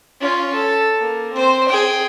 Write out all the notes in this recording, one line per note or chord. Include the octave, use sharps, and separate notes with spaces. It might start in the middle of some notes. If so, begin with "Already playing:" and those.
C#4 F4
A4
A#3
C4 C5
G#4 G5